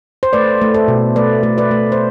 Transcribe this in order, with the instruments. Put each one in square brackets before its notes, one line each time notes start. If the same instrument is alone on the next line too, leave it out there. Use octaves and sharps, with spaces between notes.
[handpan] C5
A3 B4 D5
A3
A4 C5
B2
A3 B4 D5
A3
B4 D5
A3
C5